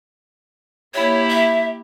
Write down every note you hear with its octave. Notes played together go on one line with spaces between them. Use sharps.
A#3 E4 G4 C#5
E5